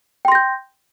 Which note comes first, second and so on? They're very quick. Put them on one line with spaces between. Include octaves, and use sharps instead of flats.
G5 C6 A#6 G6